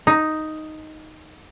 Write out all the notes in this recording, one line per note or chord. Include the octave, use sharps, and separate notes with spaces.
D#4